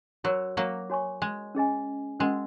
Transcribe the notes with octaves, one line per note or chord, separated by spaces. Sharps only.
F#3 F#4 A#4 C#5
F#3 A#3
F#4 C#5 G#5 C#6
G#3
C#4 G#4 D#5 G#5
G#3 C#4 F#4 A#4 D#5 F#5